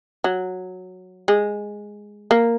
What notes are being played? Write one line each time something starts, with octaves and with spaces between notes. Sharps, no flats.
F#3
G#3
A#3